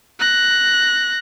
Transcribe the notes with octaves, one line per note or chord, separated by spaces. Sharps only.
F#6 A#6